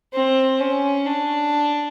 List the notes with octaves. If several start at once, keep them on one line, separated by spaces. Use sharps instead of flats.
C4
C#4
D4